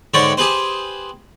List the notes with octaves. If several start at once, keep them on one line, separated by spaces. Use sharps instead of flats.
G#2 D3 C#5 D5 G5
G4 G#4 B4 C5